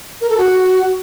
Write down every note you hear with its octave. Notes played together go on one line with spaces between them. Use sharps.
A#4
A4
F#4